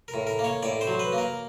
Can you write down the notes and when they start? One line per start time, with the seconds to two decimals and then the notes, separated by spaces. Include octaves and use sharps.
0.08 A#4
0.14 A2
0.27 A#4
0.39 A#3
0.44 C#5
0.63 A2 D5
0.81 C5
0.87 F#3
0.99 B4
1.12 A#3
1.18 A#4